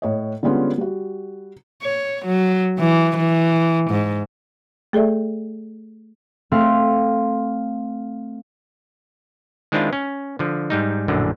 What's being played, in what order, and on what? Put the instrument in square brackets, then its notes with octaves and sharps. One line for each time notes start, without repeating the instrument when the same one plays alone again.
[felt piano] A2 C#5 D#5
D3 G3 G#3 B3 C#4 F4
G3 F#4
[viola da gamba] C#5
F#3
E3
E3
G#2
[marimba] A3 G#4 A4 D5 E5
[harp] A3 C4 F5
[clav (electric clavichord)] D#3 G#3 C4 D4 E4 F4
C#4
D3 F3
G#2 G3 D#4
A#1 F#2 A2 D3